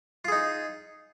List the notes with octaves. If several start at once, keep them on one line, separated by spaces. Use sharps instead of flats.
D#4 F4 G#4